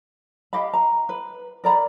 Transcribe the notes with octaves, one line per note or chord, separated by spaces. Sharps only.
G4 D#5 F5 B5
A#5
B4
A#4 D5 A#5 B5